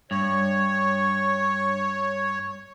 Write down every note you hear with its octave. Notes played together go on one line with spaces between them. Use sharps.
G2 C#5